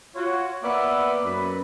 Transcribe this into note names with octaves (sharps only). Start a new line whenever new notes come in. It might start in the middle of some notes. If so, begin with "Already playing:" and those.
F4 F#4 C#5
A#3 B3 B4 D5 E5
F#2 B4 B5